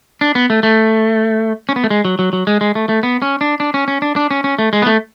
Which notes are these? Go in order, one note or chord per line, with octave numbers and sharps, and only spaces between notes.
D4
B3
A3
A3
C#4
B3
A3
G#3
F#3
F#3
F#3
G#3
G#3
A3
A3
B3
C#4
D4
D4
C#4
C#4
D4
D4
C#4
C#4
A3
G#3
B3
A3